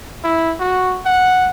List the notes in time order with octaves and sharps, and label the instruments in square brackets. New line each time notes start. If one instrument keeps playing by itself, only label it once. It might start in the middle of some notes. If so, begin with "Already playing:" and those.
[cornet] E4
F#4
F#5